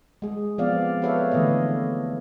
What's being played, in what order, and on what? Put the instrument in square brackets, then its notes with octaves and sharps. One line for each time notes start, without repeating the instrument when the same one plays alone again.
[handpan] G#3 G#4
F3 B3 C4 D5 F5
G4 A4 B4 C#5 E5 F5
D3 E3 A3 B3 D#5